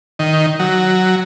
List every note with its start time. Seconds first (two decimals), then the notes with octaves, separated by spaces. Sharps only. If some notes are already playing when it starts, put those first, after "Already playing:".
0.19 D#3
0.59 F#3